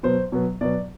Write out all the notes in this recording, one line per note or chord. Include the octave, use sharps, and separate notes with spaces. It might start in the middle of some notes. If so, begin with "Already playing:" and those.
B2 F#3 B3 C5
B2 F#3 B3
B2 F#3 B3 D5